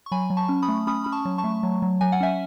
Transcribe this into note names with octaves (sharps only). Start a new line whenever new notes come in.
C#6
F#3 G#5 B5
F#3
A5 C#6
C#4
B5 D#6
A3
C#4 B5 D#6
C#4 B5
A5 C#6
F#3
A5 C#6
A3
F#3
F#3
F#3 G#5
F#5
C#4 E5 G#5